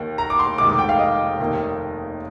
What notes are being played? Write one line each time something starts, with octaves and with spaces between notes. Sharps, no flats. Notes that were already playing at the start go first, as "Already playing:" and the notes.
Already playing: D#2 D#3 A#3
A#5
D6
C6
F1 D#2 D#3 G#3 D6
D6
G5
F5
D#5
F1 D#2 D#3 A#3